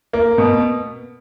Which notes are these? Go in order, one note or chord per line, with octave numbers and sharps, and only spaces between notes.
A#3
B2